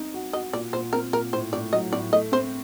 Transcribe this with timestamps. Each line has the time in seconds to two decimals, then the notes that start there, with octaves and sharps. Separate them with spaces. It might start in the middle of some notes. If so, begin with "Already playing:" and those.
Already playing: C4 D#4
0.14 F#4
0.33 F#4 D#5
0.53 A#2 D5
0.73 A#2 C5
0.93 C4 A#4
1.13 A#2 A#4
1.33 A2 C5
1.53 A2 D5
1.73 F#3 D#5
1.93 A2 D5
2.12 A3 D#5
2.32 C4 C5